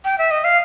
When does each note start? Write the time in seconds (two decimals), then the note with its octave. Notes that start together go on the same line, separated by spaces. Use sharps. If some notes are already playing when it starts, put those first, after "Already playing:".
0.05 G5
0.18 E5
0.31 D#5
0.44 F5